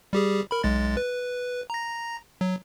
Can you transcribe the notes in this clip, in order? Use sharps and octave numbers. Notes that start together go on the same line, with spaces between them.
G3 G4 G#4
A#4 B5
B1 G#3 A6
B4
A#5 A#6
F#3